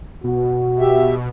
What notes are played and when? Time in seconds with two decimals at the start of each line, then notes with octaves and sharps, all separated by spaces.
0.24 B2 F#4
0.79 G4 E5